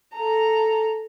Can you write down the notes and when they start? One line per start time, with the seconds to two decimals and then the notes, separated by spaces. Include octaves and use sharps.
0.16 A4 A#5